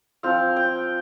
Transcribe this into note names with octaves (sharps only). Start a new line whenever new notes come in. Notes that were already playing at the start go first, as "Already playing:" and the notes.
F3 C4 F4 F5
G5